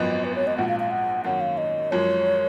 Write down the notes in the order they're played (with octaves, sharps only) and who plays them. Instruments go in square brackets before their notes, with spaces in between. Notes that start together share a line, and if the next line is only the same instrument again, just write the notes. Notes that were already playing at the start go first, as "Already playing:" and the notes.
Already playing: [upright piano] G#1 F#2 F3 B3 [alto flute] D#5
[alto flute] B4
C#5
D#5
[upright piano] A#1 G#2 F3 [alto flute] F#5
[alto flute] F5
F5
F#5
[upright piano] F#2 D#3 A#3 C#4 [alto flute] F#5
[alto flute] F5
D#5
[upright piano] F#2 F3 G#3 [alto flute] C#5